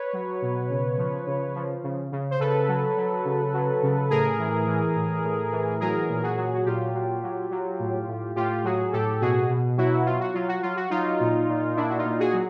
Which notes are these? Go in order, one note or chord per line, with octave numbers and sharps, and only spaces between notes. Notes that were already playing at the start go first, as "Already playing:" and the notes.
Already playing: B4 C#5
F#3
B2
C#3
F3
C#3
F3
C#3
C#3
C5
C#3 A4 B4
F#3
F#3
C#3
F#3
C#3
A2 G#4 A#4
E3
E3
A2
A2
E3
F#3 G#4 A#4
A#2
F#4 G#4
F#3
F#4
A#2 F4 G4
F#3
F#3
F#3
A2
A2
A2 F4 G4
F#3 F#4 G#4
A2 G4 A4
B2 F#4 G#4
B2
F#3 E4 F#4
F#3 F4
F#4
F#3 F4
F#4
F#3 F4
F#4
F#3 D#4 F4
A#2
A#2
A#2 D4 E4
F#4
D#4 F4
A#2
F#4 G#4
F#3